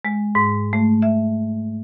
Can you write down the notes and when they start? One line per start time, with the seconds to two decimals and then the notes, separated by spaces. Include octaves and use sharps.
0.05 G#3
0.35 G#2
0.73 A3
1.02 E5